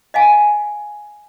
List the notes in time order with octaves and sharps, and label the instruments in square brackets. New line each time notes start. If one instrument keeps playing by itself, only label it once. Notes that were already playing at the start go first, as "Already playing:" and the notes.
[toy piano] D#5 F5 G#5